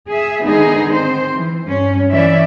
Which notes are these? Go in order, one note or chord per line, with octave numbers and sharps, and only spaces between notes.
G#4 E5
D3 D#3 G#3 B3 D#4 G#4
C4 C5
E3
G2 C#4
E3 C#4 D5 E5